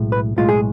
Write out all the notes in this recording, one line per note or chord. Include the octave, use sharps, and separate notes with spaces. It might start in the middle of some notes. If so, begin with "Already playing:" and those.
Already playing: B1 A2 G#3
B4
B1 A2 G#3 F4
G#4